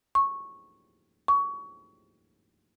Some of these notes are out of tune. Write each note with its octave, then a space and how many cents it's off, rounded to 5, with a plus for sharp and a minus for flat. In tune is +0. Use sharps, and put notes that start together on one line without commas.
C#6 -10
C#6 +25